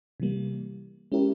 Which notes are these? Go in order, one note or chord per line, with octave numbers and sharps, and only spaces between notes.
C3 E3 G3 A#3
G#3 C#4 E4 G4 A#4